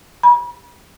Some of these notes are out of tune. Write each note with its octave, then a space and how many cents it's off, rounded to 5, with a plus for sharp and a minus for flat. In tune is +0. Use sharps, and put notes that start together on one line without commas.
B5 -35